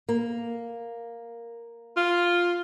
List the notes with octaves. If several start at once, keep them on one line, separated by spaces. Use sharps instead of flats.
A#3
F4